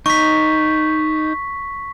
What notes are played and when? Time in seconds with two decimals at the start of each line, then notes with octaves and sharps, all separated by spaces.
0.06 D#4 C#6 B6